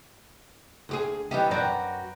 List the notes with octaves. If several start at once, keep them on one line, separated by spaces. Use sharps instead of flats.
D2 G4 G#4
E3 G3 B3 D#4 G4
F#2 F#4 B4 D5 G5 A#5